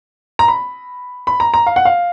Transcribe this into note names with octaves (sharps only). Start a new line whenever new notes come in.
A#5
B5
B5
A#5
A#5
F5
F#5
F5